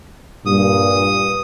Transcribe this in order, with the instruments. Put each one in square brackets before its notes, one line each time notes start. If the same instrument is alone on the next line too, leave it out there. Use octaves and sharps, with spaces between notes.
[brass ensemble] G2 A#2 [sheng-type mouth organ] D#6